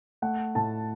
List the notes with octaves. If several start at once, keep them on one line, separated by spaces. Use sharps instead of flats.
A3 F#5
A2 A5